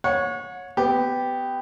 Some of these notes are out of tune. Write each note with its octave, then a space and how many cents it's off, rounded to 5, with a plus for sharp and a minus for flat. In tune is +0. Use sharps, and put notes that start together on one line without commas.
C#5 +0 F#5 -35
B3 +20 G4 +0